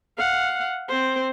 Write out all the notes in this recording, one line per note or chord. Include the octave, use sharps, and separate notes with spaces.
F5 F#5
C4 C5